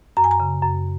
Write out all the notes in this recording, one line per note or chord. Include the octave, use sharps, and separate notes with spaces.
F#2 A#5
G#5
A#5
C#3
F#2